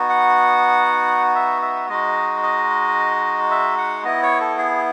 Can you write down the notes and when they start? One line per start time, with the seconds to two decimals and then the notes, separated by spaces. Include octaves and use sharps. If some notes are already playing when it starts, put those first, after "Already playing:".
Already playing: B3 D#4 F#4
0.09 F#5
1.35 E5
1.62 E5
1.89 G#3 D#4 F#4 D#5
2.43 D#5
3.51 E5
3.78 F#5
4.04 B3 E4 D#5
4.23 C#5
4.40 A4
4.58 G#4